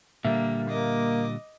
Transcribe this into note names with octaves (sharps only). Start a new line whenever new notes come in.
A#2 D3 G3 A#3 E5
A#3 D#5 D6